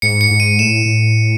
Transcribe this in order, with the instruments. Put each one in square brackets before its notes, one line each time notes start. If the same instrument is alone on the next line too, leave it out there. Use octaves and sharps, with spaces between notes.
[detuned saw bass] G#2 [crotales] C#7
[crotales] C#7
[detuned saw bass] G#2
[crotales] D#7
[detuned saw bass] A2 [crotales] E7
[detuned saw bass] A2